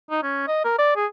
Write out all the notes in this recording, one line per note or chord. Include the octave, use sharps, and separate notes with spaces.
D#4
C#4
D#5
A#4
D5
G#4